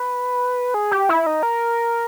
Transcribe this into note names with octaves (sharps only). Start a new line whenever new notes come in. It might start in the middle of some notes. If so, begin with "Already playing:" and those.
Already playing: B4
G#4
G4
E4
D#4
A#4